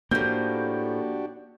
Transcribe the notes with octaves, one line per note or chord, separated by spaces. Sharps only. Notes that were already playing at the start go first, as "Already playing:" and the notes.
A2 F3 A#3 D4 F#4 G4 G6